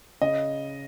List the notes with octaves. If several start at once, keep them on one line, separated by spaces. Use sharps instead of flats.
C#3 D#5